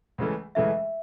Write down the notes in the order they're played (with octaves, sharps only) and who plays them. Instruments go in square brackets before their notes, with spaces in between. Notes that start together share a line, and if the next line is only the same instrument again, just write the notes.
[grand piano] C#2 C#3 E3 A3
[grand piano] C#2 C#3 E3 A3 [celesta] E5